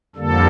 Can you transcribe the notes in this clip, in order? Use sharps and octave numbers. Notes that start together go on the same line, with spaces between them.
F2 D3 G3 A#3 A4